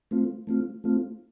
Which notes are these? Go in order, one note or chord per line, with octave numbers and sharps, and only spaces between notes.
A3 C4 F4
A3 C4 F4
A3 C4 F4